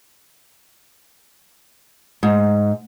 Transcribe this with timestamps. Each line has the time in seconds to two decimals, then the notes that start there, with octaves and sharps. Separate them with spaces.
2.23 G#2